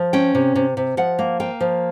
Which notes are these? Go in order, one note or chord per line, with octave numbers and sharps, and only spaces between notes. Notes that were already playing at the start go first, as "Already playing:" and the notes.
Already playing: F3
C#4 G5
C3
C3
C3
F3 F#5
A#3
A#3 G5
F3